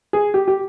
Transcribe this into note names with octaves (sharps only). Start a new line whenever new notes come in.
G#4
G4
G4